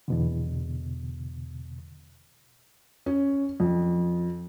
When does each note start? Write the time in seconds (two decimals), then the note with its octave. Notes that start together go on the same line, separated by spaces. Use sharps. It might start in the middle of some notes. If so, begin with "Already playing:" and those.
0.08 E2 B2 D3
3.06 C#4
3.60 F2